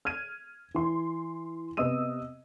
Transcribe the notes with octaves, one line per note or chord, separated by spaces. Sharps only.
F6 G#6 D#7
E3 C6
C3 B3 D#5 D#6 E6 D#7